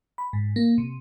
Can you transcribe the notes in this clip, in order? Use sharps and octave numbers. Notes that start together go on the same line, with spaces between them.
B5
G#2
A#3
C3